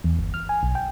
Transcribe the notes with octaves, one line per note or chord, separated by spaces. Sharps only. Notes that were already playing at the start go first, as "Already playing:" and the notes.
E2
G1
F6
G#5
B1
G5